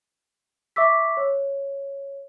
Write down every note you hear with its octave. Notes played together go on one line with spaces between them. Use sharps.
E5 C#6 D6 E6 B6
C#5